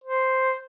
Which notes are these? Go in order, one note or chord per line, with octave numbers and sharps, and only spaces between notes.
C5